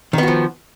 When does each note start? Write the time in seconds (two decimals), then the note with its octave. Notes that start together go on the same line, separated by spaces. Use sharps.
0.13 D#3
0.18 B3
0.23 F#4
0.28 F3